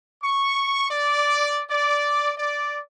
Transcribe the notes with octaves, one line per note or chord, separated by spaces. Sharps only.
C#6
D5
D5
D5